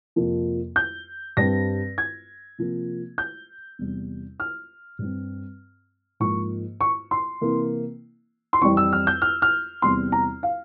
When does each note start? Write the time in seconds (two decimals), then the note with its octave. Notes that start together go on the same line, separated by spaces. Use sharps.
0.16 F2 C3 F3 A#3
0.76 G6
1.37 G2 G3 C4 A#6
1.98 G#6
2.58 C3 F3 A#3
3.18 G6
3.79 E2 C3 G3
4.40 F6
4.99 G2 G3 C4
6.20 G#2 F3 A#3 C#6
6.81 C#6
7.11 C6
7.41 C3 E3 A#3
8.53 C6
8.62 F2 E3 G3 C4 C#6
8.77 E6
8.93 F6
9.07 G6
9.22 F6
9.42 F6
9.82 E2 C3 G3 C4 C6
10.12 A#5
10.43 F5